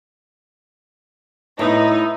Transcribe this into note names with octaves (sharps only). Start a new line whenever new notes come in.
A2 B3 D#4 E4